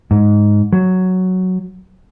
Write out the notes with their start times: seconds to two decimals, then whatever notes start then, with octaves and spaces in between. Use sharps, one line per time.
0.11 G#2
0.73 F#3